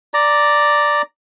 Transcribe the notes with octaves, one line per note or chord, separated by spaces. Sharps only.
D5 A#5